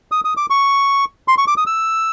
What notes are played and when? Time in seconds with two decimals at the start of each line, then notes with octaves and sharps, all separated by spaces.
0.12 D#6
0.25 D#6
0.37 D6
0.50 C#6
1.28 C6
1.38 C#6
1.47 D6
1.57 D#6
1.67 E6